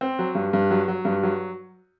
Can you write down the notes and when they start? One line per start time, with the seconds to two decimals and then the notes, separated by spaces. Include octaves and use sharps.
0.01 C4
0.19 F#3
0.35 G2
0.53 G2
0.71 F#3
0.88 F#3
1.05 G2
1.23 F#3